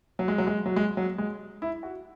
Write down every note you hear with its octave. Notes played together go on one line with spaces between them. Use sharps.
F#3
G#3
F#3
G#3
F#3
G#3
F#3
G#3
E4
F#4